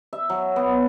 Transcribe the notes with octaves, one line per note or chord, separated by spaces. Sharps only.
E5
F#3
B3